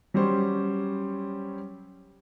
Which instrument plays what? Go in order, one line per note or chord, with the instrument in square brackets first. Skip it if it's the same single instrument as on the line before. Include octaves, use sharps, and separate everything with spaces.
[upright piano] F#3 G3 C#4 G4 C5 C#5